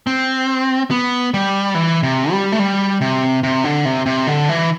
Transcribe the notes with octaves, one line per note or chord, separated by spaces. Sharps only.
C4
B3
G3
E3
C3
G3
A3
G3
C3
C3
D3
C3
C3
D3
E3